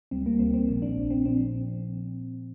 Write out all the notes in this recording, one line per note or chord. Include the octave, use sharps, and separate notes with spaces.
D2 C3 G3 C4
A#3
D2 C3 G3 C4
C4
A#1 A#2 F3 C4
D4
A#1 A#2 F3
C4
A#2 F3 C4